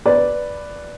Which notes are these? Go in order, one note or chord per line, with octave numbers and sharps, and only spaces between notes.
B4 D5